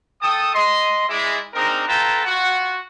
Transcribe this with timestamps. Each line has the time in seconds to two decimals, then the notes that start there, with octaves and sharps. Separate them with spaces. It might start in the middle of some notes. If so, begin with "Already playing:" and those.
0.21 A4 G5 A5 D#6
0.54 D#5 C6
1.08 G#3 E4 D5
1.54 G#3 C4 D4 D#4 A#4
1.87 F4 A4 B4 G5 A5 A#5
2.25 F4 F#4 F#5 C#6